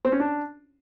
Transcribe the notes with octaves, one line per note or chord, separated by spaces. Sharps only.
C4
C#4
D4